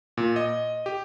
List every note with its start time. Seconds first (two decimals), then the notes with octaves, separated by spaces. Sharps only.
0.17 A#2
0.36 D#5
0.86 G4